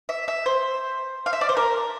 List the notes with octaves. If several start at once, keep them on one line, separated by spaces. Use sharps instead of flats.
E5
E5
C5
F5
E5
D5
C5
A#4